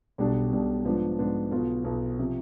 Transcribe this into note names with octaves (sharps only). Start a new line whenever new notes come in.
B1 B2 G3 D4
B1 B2 G3 D4
G#2 F3 B3 D4
G#2 F3 B3 D4
B1 B2 B3 F4
B1 B2 B3 F4
C3 F3